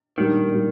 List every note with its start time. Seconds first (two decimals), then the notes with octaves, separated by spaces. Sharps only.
0.17 A#2 D#3 G3 D4
0.52 A#2 G3